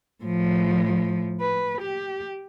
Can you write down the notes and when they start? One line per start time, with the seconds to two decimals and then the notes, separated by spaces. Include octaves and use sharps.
0.24 A2 F3
1.41 B4
1.82 G4